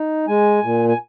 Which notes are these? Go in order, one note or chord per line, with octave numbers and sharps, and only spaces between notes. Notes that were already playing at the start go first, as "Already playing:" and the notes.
Already playing: D#4
G#3 G#5
A#2
G#5